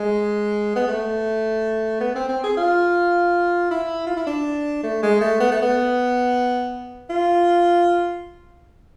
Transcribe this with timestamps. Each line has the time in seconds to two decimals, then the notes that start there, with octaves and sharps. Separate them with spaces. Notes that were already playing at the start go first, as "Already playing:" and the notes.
Already playing: G#3
0.76 B3
0.87 A3
2.00 B3
2.15 C4
2.28 C4
2.43 G#4
2.57 F4
3.71 E4
4.07 F4
4.17 E4
4.27 D4
4.83 A3
5.02 G#3
5.21 A3
5.40 B3
5.51 A3
5.62 B3
7.10 F4